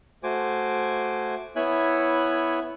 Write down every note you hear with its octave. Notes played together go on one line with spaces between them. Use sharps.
A3 F#4 C5 G#5 D6
B3 E4 C#5 E5 G#5 F#6